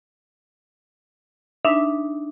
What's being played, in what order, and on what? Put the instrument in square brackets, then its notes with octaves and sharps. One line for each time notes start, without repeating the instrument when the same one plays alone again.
[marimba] D4 D#4 [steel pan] E5